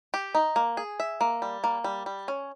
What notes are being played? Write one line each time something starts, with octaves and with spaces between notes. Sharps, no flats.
G4
D#4
A#3
G#4
E5
A#3
G3
A#3
G3
G3
C#4